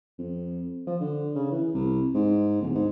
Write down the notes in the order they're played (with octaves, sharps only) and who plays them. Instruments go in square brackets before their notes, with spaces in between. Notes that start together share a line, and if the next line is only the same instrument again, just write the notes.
[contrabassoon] F2
F3
D3
C#3
E3
C2
G#2
D1
G#2